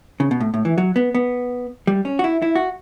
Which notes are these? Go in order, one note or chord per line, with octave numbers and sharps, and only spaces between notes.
C#3
B2
A2
A2
E3
F#3
B3
B3
G3
C#4
F#4
E4
E4
F#4